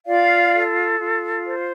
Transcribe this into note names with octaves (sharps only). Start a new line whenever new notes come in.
F4 D5 F5
A4
F4
C5